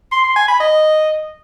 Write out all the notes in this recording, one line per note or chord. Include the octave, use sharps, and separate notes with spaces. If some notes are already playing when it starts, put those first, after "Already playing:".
C6
C6
G#5
B5
D#5